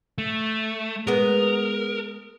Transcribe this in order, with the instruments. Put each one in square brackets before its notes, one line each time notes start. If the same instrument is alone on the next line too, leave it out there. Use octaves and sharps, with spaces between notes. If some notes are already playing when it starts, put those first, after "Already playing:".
[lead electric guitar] A3
[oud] G#3 B3 [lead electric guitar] A#4